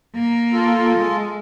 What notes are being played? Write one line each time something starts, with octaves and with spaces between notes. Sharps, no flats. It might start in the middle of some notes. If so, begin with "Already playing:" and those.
A#3
F4 A4
G#3